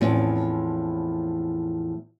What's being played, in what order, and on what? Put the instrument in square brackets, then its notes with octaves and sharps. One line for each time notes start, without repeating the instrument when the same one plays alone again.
[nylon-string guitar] E2 A2 F3 C4 C#4 E4